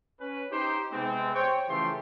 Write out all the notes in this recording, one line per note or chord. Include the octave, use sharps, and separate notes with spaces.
C#4 B4
D#4 G4 C5
C3 G#3 B3 C4
C5 C#5 G5
C#3 E3 F3 A3 G4 C6